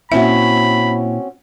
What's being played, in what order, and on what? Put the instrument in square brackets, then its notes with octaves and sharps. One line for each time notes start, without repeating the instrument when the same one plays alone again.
[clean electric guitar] A#2 E4 [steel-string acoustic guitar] C4 C#4 F#4 [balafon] E5 [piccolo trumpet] B5